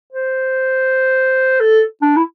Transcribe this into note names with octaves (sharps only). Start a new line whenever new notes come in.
C5
A4
D4
E4